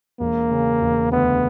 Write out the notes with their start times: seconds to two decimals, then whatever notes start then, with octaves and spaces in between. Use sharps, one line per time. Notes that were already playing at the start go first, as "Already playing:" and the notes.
0.20 E1 A#3
0.51 C#3
0.81 E1
1.12 D2 B3